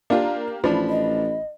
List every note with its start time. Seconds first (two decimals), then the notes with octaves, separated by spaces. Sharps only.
0.10 A#3 D4 F4 G4
0.64 A1 F3 D4 B5
0.89 D#5